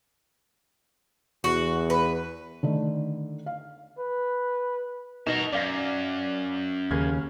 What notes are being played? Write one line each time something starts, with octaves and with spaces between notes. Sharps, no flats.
E2 F#4
B4
D3 D#3 A3
F5
B4
B2 D#4 A#4 F#5 E7
F#2 D5 F5 A#6
D#2 C#3 F6 G#6